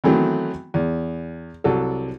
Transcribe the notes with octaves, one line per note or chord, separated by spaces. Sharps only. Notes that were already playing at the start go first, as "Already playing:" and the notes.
D#3 E3 F#3 A3 B3 C4
E2
C2 F#3 A4